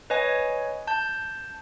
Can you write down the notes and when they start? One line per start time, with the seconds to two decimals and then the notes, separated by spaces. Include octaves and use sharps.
0.10 B4 C#5 D#5 G#5
0.87 A5 G6